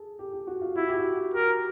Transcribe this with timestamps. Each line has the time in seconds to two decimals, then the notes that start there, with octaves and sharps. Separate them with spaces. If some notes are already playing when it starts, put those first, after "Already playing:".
Already playing: G#4 A4
0.19 G4
0.33 G4
0.47 F#4
0.62 F4
0.76 E4 F#4
0.88 G4
0.98 F#4
1.34 G4 A#4